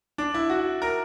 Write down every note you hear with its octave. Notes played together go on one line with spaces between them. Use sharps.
D4
E4
F#4
A#4